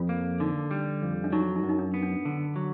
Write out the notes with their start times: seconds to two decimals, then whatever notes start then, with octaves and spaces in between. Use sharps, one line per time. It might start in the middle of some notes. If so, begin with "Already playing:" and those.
Already playing: F2 F4
0.09 A#3
0.40 D3 D#4
0.71 G3
1.02 F2
1.24 D4
1.32 F#3 D#4
1.56 D#4
1.64 F#2
1.69 D#4
1.79 D4
1.94 B3
2.03 D4
2.25 D3
2.56 F#3